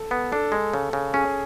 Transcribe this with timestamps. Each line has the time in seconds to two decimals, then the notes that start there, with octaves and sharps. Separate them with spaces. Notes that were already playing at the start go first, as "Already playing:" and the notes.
Already playing: A4
0.11 B3
0.32 D4 A4
0.52 G#3
0.74 C#3
0.93 C#3
1.14 C#4 G#4